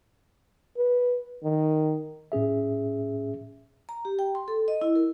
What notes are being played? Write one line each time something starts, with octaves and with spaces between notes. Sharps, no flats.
B4
D#3
A2 C#4 G#4 E5
A#5
G4
G5
C6
A4
D#5
E4
A#4